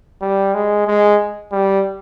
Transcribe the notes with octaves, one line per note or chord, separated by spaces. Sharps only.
G3
G#3
G#3
G3